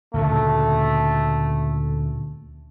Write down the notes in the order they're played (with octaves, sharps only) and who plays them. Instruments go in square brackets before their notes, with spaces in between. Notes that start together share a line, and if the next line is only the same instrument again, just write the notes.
[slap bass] D2 A#2 C#3 [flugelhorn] A3